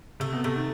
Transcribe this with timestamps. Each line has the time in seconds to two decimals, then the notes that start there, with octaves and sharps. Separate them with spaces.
0.20 C3 A3
0.33 B2
0.44 C3 A3
0.56 D#3